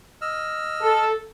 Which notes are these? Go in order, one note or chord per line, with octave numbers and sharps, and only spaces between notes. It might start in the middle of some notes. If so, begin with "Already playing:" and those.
D#5 E6 F6
A4